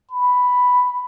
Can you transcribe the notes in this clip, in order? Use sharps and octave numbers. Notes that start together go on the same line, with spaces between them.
B5